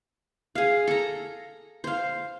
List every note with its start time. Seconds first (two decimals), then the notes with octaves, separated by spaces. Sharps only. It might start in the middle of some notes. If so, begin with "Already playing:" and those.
0.55 G#4 F5
0.87 A4 A#5
1.84 C5 F5